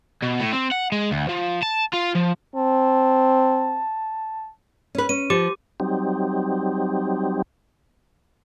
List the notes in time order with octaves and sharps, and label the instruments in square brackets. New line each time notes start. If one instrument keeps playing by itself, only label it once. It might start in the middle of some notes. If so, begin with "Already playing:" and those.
[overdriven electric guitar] B2
A2
C4
F#5
G#3
D2
F3
A5
F4
F3
[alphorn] C4 [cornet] A5
[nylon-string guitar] C#4 B4
[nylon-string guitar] C#4 [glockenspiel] D#7
[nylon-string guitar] F3 [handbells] G4 [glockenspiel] D6
[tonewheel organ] F#3 G3 C4 D#4 G4